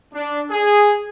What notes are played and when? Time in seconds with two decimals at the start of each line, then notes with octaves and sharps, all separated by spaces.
0.13 D4
0.51 G#4